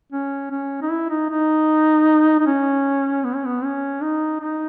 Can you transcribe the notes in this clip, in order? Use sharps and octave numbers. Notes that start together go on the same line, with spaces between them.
C#4
C#4
D#4
E4
D#4
D#4
D#4
C#4
B3
C#4
B3
C#4
D#4
D#4